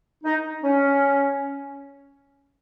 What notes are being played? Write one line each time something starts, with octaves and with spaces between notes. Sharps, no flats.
D#4
C#4